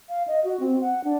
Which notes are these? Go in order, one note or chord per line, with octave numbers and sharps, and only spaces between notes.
F5
D#5
F#4
C4
F#5
D4